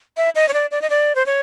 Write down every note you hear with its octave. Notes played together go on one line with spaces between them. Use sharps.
E5
D#5
C#5
D5
D5
D#5
D5
C5
C#5